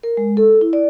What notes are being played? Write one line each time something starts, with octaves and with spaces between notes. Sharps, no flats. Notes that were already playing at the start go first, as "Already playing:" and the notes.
A#4
G#3
A4
E4
D5